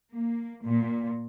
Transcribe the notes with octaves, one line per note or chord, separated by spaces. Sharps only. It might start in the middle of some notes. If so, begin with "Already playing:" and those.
A#3
A#2